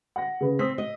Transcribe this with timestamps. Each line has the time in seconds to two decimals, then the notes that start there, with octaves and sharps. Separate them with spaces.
0.16 F#5 A#6
0.41 C#3 B4
0.59 C4 D#6 E6 B6
0.78 D#5